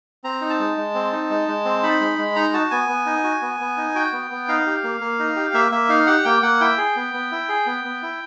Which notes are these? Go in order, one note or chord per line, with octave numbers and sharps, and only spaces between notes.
C4 A#5
D#4
A5
G#3
G#3
C4
D#4
G#3
G#3
C4
D#4 B5
G#3
G#3
D#4 A#5
F#4 A5
B3 G#5
B3
D#4
F#4
B3
B3
D#4
F#4 G5
B3
B3
D#4 F5
G4
A#3
A#3
D#4
G4
A#3 E5
A#3 E5
D#4 F5
G4 F#5
A#3 G5
A#3 F#5
E4 G5
G#4
B3
B3
E4
G#4
B3
B3
E4